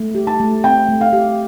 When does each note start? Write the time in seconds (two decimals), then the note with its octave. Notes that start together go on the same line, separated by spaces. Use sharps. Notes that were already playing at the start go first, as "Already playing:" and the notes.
Already playing: A3
0.15 G4
0.27 A5
0.40 A3
0.64 C4 G5
0.89 A3
1.01 F5
1.13 G4